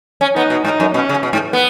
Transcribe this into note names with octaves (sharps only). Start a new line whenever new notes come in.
C#4
B3 D#4
B2
G#2 D#4
F#2
B2 C#4
C#3
B2
G#2
B3